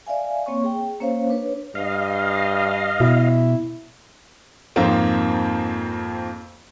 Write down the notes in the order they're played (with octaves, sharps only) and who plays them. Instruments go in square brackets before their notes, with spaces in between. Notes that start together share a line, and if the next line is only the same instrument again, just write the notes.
[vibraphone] D5 E5 F5 G#5
A#3 C4 C#5 C#6
G#4 G5
A#3 C#4 C5 C#5 F5
D4 B4 C#5
[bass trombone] G2 [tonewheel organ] D#5 F5
[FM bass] B2 [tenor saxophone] E4
[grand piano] F2 G#2 F3 A#3 C4 F4